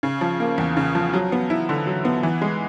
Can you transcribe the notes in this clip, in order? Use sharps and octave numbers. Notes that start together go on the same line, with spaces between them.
C#3
F3
A#3
E2
C#3
F3
F#3
B3
E4
D3
F#3
B3
E3
G#3